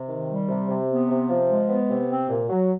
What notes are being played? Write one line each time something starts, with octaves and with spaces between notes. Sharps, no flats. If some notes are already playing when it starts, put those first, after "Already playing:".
Already playing: C3
D#3
G3
C3
C3
B3
C3
F3
G#3
B3
C3
C4
A#2
F#3